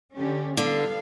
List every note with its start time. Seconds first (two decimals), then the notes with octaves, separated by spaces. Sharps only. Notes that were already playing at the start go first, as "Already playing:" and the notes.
0.16 D3 C#4 G4
0.57 D3 G3 B3 F5